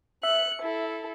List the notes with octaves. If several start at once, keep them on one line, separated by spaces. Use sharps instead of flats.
E5 F#6 C#7
E4 A4